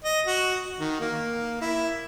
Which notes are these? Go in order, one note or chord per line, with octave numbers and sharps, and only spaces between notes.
D#5
F#4
D#3
A#3
E4